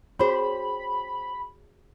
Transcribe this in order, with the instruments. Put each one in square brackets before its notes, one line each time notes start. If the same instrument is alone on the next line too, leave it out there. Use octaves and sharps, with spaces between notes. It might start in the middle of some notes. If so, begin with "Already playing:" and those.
[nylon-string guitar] C4 C5 [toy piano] F#4 G#4 C#5 [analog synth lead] B5